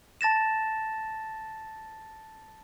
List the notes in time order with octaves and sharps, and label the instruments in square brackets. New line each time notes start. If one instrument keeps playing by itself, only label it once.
[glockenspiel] A5 A6 A#6 E7